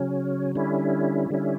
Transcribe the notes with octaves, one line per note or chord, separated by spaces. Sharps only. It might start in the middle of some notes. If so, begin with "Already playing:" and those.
Already playing: C#3 F#3 C#4
D3 G3 C#4 E4
D3 G3 C#4 E4